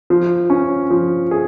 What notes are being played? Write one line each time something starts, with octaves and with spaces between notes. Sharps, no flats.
F3
C#4
F3
G#4